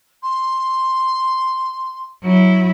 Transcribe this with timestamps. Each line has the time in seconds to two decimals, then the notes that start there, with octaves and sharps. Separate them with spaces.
0.22 C6
2.23 F#3 E4